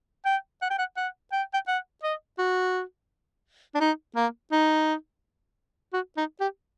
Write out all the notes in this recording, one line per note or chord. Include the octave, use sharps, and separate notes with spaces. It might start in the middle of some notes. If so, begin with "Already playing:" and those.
G5
F#5
G5
F#5
F#5
G5
G5
F#5
D#5
F#4
D4
D#4
A#3
D#4
F#4
D#4
G4